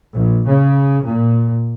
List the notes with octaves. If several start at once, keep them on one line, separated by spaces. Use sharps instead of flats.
A#1
C#3
A#2